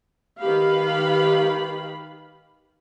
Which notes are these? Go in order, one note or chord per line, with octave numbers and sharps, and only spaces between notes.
D#3 G4 B4 F5 B5